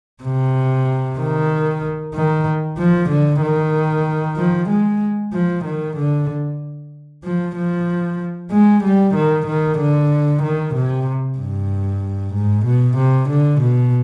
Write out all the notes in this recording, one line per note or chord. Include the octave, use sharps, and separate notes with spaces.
C3
D#3
D#3
F3
D3
D#3
F3
G#3
F3
D#3
D3
F3
F3
G#3
G3
D#3
D#3
D3
D#3
C3
G2
G#2
B2
C3
D3
B2